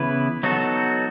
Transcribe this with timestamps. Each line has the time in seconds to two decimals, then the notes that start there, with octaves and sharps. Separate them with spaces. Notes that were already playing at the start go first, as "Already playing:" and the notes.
Already playing: C#3 E3 B3 E4 B4
0.43 F#3 B3 D#4 F#4 A4